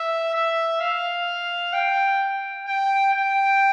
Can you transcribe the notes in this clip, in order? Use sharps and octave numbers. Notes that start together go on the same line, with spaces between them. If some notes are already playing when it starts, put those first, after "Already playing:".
Already playing: E5
E5
F5
G5
G5
G5